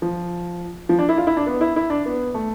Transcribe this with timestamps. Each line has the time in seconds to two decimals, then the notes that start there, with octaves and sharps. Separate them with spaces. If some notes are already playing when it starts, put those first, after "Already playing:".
0.02 F3
0.89 F3
0.99 D4
1.09 E4
1.18 F4
1.27 E4
1.37 D4
1.47 B3
1.61 E4
1.76 E4
1.90 D4
2.06 B3
2.34 A3